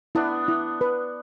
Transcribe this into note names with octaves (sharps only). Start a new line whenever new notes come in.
B3 D4 E4
E4
B4